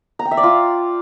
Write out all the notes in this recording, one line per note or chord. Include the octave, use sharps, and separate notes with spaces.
A#5
G5
E5
D5
F4